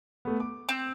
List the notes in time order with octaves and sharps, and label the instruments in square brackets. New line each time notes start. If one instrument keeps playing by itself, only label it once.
[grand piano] A3 B3
D6
[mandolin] C4